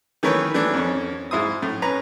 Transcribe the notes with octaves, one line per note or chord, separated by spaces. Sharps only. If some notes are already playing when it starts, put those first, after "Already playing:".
D#3 E3 A3 A#4 B4 C#5
E3 A3 B3 D4
F2 C#4
G#2 E4 C5 D#6
A2
C#4 B4 A#5